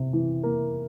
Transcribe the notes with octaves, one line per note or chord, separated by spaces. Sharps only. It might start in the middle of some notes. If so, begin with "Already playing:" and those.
Already playing: C3
E3
A#3